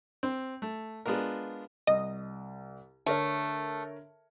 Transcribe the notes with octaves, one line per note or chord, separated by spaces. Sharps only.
C4
A3
G#3 B3 D4 F4 A#4
C2 D#5
D3 A3 A#4 C#5